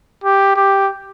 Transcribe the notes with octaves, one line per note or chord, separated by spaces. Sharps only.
G4
G4